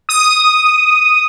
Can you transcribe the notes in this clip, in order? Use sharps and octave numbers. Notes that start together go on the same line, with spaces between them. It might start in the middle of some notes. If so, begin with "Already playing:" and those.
D#6